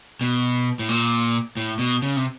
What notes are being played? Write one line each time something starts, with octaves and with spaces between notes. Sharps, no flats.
B2
A2
A#2
A2
B2
C#3
C3